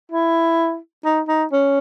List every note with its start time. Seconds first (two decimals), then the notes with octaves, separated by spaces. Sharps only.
0.12 E4
1.05 D#4
1.28 D#4
1.52 C#4